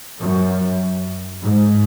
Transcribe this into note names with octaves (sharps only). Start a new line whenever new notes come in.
F#2
G#2